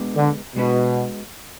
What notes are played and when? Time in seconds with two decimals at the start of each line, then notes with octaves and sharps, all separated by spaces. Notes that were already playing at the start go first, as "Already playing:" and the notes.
Already playing: B2 G#3 B3 D4 G#4
0.16 D3
0.56 B2 G#3 B3 D4 F#4 B4